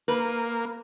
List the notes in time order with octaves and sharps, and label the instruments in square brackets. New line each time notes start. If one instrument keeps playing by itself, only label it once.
[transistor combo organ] A#3 [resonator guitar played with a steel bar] B4